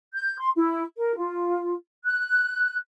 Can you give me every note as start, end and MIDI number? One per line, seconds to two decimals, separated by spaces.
0.14 0.39 91
0.39 0.50 84
0.56 0.84 64
0.98 1.15 70
1.17 1.73 65
2.04 2.77 90